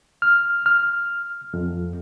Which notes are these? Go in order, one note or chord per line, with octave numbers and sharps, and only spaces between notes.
F6
F6
F2